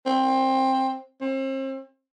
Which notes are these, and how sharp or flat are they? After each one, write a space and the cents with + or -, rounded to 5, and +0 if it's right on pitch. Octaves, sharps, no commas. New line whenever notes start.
C4 +15
C4 +40